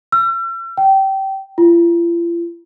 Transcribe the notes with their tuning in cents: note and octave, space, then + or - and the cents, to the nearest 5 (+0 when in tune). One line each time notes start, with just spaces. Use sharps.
E6 +45
G5 -20
F4 -45